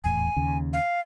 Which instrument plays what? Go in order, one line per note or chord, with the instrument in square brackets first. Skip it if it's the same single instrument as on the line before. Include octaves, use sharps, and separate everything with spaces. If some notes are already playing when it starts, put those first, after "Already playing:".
[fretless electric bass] D#1 E2 A2 [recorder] G#5
[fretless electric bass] D#2 C#3
[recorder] F5